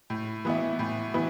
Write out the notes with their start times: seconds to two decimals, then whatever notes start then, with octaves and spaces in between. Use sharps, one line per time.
0.10 A2
0.45 E3 B3 E4
0.79 A2
1.14 E3 B3 E4